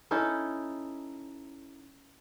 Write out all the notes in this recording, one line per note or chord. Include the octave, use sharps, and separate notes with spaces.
C#4 D#4 E4 A4